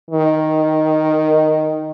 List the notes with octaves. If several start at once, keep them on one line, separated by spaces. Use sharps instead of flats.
D#3